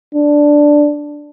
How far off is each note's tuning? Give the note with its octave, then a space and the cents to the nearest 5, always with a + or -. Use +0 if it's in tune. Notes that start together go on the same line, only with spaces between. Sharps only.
D4 +0